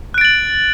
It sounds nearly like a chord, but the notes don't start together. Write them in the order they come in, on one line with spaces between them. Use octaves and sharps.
F#6 D7 A6 F#7